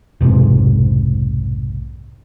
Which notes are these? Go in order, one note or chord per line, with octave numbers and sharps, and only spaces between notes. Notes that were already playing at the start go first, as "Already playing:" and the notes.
F1 B1 G#2 C3